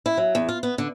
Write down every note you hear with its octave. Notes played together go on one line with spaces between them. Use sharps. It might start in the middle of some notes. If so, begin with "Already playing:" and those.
E4
F#3
E2
F4
B3
D3